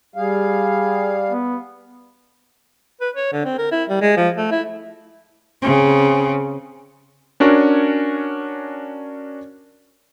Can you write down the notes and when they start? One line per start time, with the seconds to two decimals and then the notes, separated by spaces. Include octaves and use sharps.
0.16 G3 G#4 F5
1.31 B3
3.01 B4
3.16 C#5
3.33 D3
3.45 C4
3.58 A#4
3.72 E4
3.89 G3
4.02 G#3
4.17 F3
4.37 A3
4.51 E4
5.62 C#3 C4
7.40 C#4 D4 F#4 A#4 C#5